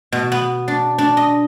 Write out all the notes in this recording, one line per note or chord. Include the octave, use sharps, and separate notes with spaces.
B2
B3
D4
D4
D#5